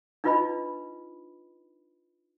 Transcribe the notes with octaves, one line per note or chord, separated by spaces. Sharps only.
D4 D#4 F4 B4 D#5 B5